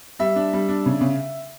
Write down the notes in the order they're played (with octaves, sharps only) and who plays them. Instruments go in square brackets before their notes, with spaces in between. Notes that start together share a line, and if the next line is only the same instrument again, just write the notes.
[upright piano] G3 E5
D4
G3
D4
C#3
C#3